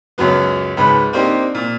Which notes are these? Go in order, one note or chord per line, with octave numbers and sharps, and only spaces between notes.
C#2 F#2 F#3 B3
C#2 G#2 B4 B5
A#3 C4 D4 D#4 G4 A#4
A#2